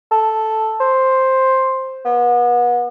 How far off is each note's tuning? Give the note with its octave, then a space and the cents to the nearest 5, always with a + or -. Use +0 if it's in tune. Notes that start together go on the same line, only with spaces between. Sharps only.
A4 -5
C5 +5
B3 -35